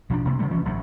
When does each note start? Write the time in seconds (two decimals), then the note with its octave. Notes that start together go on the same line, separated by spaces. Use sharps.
0.10 B1 F3 G3 D4
0.25 C2 C3 A#3
0.39 C#3 F#3 G3 A3
0.51 E3 F3 C#4
0.65 A1 G2 F#3